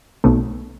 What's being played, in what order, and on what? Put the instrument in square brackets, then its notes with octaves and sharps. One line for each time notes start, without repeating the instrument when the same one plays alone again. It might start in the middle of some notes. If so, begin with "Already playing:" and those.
[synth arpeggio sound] B1 B2 A3